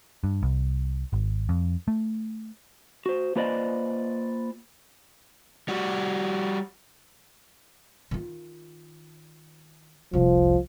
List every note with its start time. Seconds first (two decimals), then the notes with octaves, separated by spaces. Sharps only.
0.24 G2
0.42 C2
1.13 G#1
1.49 F2
1.88 A3
3.06 F#4 C5
3.36 A#3 F4 B4 C5 D5 D#5
5.68 G3 F#4
8.11 D#3 F4
10.13 F1 C2 F3